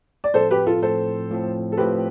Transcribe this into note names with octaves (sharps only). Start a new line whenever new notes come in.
D5
A2 F3 C4 A4 C5
G4 B4
F4 A4
A2 F3 C4 A4 C5
A2 F3 C4
A4
A2 F3 C4 G4 B4